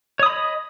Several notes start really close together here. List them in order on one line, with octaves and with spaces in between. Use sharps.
C#5 D#6 B5 D#5